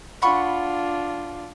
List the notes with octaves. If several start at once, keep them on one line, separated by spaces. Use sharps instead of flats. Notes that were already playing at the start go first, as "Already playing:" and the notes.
D4 F4 F#5 B5 C#6